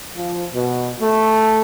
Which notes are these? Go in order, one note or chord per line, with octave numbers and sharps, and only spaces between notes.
F3
B2
A3